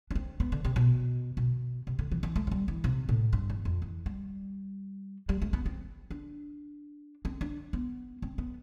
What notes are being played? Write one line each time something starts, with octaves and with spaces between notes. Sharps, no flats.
D4
C4
B3
D3
C3
B2
B2
C3
D3
E3
E3
A3
A3
G3
E3
C3
A2
G2
E2
F2
E3
G3
G3
A3
B3
C4
D4
C4
D4
B3
C4
B3